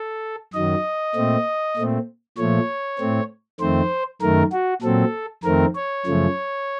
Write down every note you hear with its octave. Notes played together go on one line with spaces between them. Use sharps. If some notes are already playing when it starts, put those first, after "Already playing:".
Already playing: A4
F#2 D#3 F#3 D#5
A#2 A3 C4
A#2 A3 C4
A#2 F3 A3 C#5
A2 A3 C4
F2 D#3 A3 C4 C5
F#2 D#3 A3 A#4
F#4
A#2 F#3 C4 A4
F2 D#3 A3 C4 A#4
C#5
F#2 C#3 F3 A3